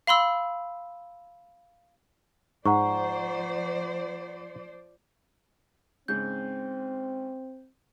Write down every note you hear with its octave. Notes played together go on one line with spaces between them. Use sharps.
F5 B5 C6 E6
G#2 F3 C5 D5 F#5 A#5 C#6
G#2 C#3 C4 G6